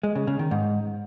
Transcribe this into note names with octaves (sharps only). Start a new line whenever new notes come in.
G#3
C#3
C#3
D#3
G#2